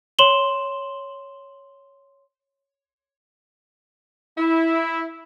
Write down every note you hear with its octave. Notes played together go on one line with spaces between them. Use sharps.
C#5 C6 E7 F#7 G7
E4